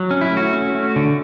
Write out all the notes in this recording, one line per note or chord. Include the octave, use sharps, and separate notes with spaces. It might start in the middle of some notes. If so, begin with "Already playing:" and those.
Already playing: F#3
C#4
E4
A3
F#4
C#4
A3
D3